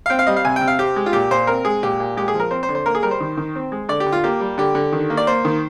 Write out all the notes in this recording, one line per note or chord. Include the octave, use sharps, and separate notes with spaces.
F5
C4 G5
F5
G3 D#5
F5
C3 G#5
G5
C3
F5
C4 G4
G#3
F4
A#2 G4
A#2 C5
C4 A#4
G#3 G#4
A#2 G4
A#2
G#3 G4
G#4
F3
A#4
C4 C5
C5
D3
C5
A#3 A#4
G#4
G3 A#4
C5
D#3
D#3
C4
G#3
D3 D5
G4
D3
F4
A#3 G4
G3
D3 G4
D3
D#3
A#3
D5
A#3 C5
D#3